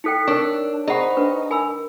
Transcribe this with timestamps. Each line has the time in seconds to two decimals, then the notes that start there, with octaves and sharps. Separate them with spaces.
0.04 D#4 A4 G5 F#6 B6 C#7
0.27 D4 A#4 C#5 C#6 E6
0.87 D#4 G#4 C5 D5 F#5 B5 C#6
1.17 D4 B4
1.51 A#4 G#5 B5 E6